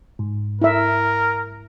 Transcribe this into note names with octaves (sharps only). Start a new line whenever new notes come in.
G#2
E4 A#4 E5